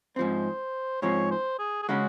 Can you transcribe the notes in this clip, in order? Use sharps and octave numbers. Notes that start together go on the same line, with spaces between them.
G#2 F3 C4 C5
G#2 F3 C4 C#5
C5
G#4
G#4
C#3 G#3 C#4 F#4